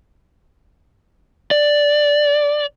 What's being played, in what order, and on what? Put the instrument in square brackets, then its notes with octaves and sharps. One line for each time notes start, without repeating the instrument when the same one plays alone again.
[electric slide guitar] D5